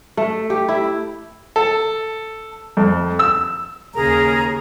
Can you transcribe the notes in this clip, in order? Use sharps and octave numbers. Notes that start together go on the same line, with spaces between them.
A3
G4
E4
A4
F2
E6
D#2 C#3 G#4 A#4 A#5